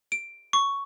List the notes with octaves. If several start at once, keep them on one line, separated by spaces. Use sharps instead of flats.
D7
C#6